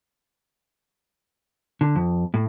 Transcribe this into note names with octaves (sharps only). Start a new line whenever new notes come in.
D3
F2
A2